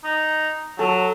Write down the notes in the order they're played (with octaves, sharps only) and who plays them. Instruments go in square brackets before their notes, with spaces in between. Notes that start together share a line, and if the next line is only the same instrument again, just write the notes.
[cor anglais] D#4
[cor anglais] F#3 [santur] A4